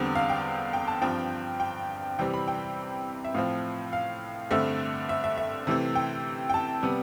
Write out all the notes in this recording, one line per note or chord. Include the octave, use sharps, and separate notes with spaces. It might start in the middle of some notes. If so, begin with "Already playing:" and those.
Already playing: E2 D3 G3 C4
F5
G5
G5
A5
G2 F3 C4 G5
G5
C3 E3 G3 C4 G5
B5
G5
E5
A2 F3 C4 F5
F5
G2 D3 A3 C4 E5
E5
E5
E5
C3 E3 A3 C4
G5
G5
A5
C3 G3 B3